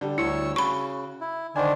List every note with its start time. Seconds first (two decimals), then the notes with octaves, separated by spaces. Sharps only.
0.01 D3 G3
0.18 D2 E4 C#5 E6
0.56 C#3 F#4 B5 C#6
1.21 E4
1.56 D3 D#3 D4 C5 G#5